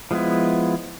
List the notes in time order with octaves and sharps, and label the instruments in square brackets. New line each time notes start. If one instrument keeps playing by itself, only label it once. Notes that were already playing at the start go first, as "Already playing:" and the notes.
[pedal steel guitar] F3 G#3 B3 E4